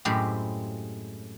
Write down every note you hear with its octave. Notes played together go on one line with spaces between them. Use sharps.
F#2 A2 G#3 C4 G4 B5